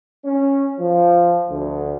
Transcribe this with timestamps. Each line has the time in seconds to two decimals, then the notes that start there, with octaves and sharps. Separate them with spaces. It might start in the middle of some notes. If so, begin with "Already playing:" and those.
0.24 C#4
0.79 F3
1.50 D2